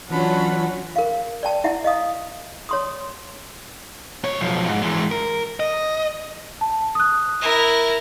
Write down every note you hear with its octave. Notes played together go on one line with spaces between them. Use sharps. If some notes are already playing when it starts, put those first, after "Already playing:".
E3 F#3 C#4 D4 F4 F#4 F#5 B5
A#4 F5
D5 G5 A5
E4 E5 F#5
D#5 F5 D#6
C#5 C6 D#6
D2 C#5
B1 F3
G#2
E3 G#3
A#4
D#5
A5
D#6 F#6
E4 A#4